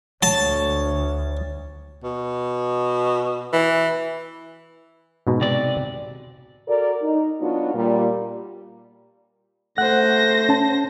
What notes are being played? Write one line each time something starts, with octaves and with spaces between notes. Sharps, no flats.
D2 C#5 A5
B2
E3
G#2 B2 D#4
C3 D5
F#4 A4 A#4 D5
D#4
F#3 B3 D4 D#4 F4 F#4
A#2 G3
A3 C5 F#5 F#6 A#6
C#4 A5